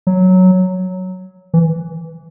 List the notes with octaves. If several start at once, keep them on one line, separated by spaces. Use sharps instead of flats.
F#3
E3